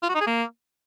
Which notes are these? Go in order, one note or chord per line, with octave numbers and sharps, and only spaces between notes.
F4
F#4
D#4
G#4
A#3